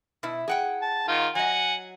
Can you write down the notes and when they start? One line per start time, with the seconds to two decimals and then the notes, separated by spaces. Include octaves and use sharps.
0.23 B2 E4
0.48 G#4 F#5 G5
0.82 A5
1.08 D#3 F4
1.35 F#3 D#5 F#5 G#5